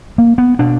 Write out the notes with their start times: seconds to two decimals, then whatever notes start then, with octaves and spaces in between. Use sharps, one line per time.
0.18 A#3
0.38 B3
0.59 B2 D4